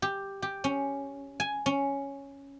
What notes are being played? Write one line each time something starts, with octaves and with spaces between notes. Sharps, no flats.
G4
G4
C#4
G#5
C#4